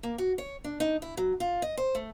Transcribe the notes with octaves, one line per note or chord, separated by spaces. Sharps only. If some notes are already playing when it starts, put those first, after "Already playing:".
A#3
F#4
C#5
D4
D#4
E4
F#3
F4
D#5
C5
A3